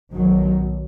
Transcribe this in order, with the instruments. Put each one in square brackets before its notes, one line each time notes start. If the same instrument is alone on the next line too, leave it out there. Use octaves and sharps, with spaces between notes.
[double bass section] B1 B2 D#3 F#3